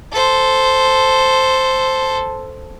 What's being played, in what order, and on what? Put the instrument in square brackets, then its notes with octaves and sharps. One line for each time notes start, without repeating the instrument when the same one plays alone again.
[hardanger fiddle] A4 C5